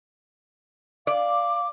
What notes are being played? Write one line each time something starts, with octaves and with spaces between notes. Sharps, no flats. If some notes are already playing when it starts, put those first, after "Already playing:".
D5 F5 D6